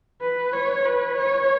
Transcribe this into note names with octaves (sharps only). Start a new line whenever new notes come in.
B4
C#5
B4
C#5